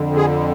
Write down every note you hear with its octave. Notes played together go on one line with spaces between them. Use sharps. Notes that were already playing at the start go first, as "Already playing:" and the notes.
Already playing: F2 D3
G#4